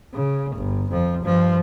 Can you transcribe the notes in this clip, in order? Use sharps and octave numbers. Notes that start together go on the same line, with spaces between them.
C#3
G1
F2 F3
G2 F3